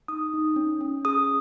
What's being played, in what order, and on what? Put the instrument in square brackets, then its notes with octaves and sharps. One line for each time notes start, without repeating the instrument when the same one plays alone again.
[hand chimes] D#4 D#6
D#4
C#4
C#4
G#4 D#6